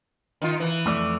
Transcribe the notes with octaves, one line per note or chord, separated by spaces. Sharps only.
D#3 F4
E3
F2 A3 D5